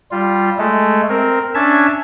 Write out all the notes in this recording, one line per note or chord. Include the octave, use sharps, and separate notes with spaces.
G3 F4
G#3 A3 A4
C4 A#4
C#4 D4 E5 A5 G#6